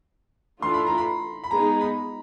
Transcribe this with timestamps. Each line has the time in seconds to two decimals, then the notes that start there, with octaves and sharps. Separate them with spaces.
0.62 E3 A3 D4 F4 A4 C6
0.74 B5
0.86 A#5
0.98 B5
1.44 B5
1.51 G#3 B3 D#4 G#4 A#5
1.81 B5